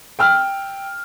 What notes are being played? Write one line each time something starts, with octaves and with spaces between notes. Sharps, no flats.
G5 E6 F6